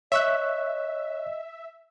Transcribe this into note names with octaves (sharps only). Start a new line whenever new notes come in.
C#5 D#5 E5 C#6 F#6